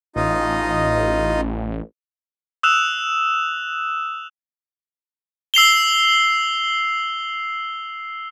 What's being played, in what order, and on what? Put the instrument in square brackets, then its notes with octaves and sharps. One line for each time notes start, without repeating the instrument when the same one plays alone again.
[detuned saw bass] A1 [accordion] D#4 F4 D#5
[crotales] D#6 E6 F#6 E7 F7
E6 C7 F7 G7